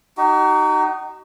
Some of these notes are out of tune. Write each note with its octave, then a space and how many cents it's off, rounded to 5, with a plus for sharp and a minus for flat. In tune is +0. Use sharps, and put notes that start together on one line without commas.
D#4 -15 F#4 +40